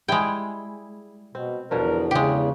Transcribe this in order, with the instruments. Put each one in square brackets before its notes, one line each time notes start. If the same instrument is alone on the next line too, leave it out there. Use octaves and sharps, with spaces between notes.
[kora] G3 E4 G#4 [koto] G#3 G5
[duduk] B2 [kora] C4
[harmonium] E2 [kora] B2 D3 F3 [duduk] A#4
[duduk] C#3 [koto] G#3 G4